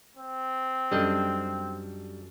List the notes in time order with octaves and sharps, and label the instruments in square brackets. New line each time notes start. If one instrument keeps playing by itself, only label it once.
[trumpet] C4
[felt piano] F#2 A4 [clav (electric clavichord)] G3 D4 D#5